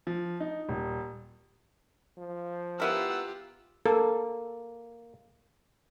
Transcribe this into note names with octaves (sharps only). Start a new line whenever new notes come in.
F3
D#4
D#1
F3
B3 E4 F4 G4 A#4 F#5 E6
A#3 A4